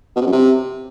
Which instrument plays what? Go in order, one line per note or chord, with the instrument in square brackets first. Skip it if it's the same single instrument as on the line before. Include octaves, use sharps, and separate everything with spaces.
[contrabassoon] B2
C3
F#2
C3